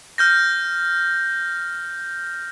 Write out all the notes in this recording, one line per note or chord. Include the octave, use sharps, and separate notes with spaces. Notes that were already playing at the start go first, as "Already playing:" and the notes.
F6 G6 A#6